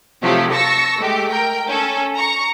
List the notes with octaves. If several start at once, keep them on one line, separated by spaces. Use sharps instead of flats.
C3 F3 F#3 A3 G4
A5 C#6 E6 A#6
G#3 A3 G4
A#4 G5
C#4 A4
A#5 C#6